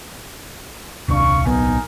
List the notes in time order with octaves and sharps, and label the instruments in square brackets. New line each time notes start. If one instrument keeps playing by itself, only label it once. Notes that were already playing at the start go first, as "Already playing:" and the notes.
[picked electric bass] D#1 C2 D4 [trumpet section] F5 C#6
[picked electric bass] D1 B1 B3 [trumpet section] D#4 A#4 G#5